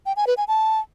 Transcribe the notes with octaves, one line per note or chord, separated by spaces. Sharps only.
G5
G#5
B4
G#5
A5